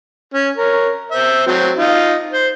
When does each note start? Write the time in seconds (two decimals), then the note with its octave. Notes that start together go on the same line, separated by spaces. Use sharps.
0.34 C#4
0.56 A#4 C#5
1.11 C5 E5
1.47 F#3 C4
1.77 D#4 F4
2.33 C5